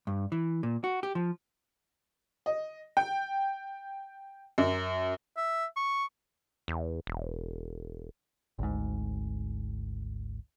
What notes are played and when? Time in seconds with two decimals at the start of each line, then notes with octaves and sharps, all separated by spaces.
0.07 G2
0.32 E3
0.63 A#2
0.84 F#4
1.03 G4
1.15 F3
2.46 D#5
2.97 G5
4.58 F#2
5.37 E5
5.76 C#6
6.68 E2
7.07 E1
8.59 G#1 D2 G#2